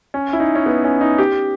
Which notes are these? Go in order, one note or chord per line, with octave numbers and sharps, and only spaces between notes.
C#4
E4
D#4
C#4
B3
C#4
D#4
G4